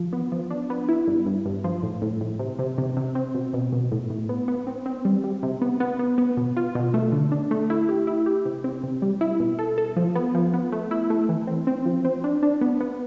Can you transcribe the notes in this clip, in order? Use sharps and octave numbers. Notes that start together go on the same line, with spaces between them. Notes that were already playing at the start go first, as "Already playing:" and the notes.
Already playing: F3
B3
F3
D4
B3
E4
G2
G2
G2
F3
A2
A2
A2
C3
C3
C3
C3
C4
B2
B2
B2
A2
A2
B3
B3
C4
C4
G3
G3
C3
B3
B3
B3
B3
B2
F4
B2
A3
D3
D4
A3
E4
G4
E4
G4
C3
C4
C3
G3
E4
B2
A4
A4
F3
B3
F3
B3
A3
E4
A3
E3
C4
C4
F3
C4
D4
D4
B3
B3